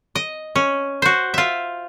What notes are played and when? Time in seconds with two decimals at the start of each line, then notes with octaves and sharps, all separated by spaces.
0.15 D#5
0.56 C#4
1.02 F#4 C5
1.34 F4 E5